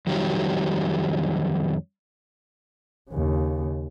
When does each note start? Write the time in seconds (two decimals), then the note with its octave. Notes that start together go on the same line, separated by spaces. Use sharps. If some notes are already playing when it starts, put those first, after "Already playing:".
0.07 F2 D#3 F#3 G3
3.10 D#2 C#3